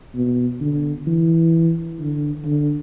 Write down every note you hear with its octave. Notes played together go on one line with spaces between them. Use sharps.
B2
D3
E3
D3
D3